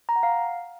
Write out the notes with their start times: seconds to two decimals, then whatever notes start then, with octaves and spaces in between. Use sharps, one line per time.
0.09 A#5
0.16 F#5
0.23 F5